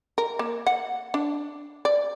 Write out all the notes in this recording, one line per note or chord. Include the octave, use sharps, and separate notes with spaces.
A#4
A#3
F#5
D4
D5